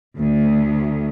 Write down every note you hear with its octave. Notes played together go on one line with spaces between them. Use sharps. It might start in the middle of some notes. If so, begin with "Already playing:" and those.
D2